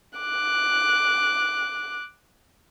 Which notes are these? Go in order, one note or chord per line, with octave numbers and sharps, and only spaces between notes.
D6 F#6